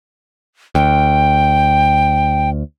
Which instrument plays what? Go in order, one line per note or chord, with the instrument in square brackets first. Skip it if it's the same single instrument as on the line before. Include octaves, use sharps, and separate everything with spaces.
[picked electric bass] D2 [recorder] G5